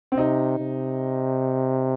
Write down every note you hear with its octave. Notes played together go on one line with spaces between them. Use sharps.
C4
C3 D#4
C3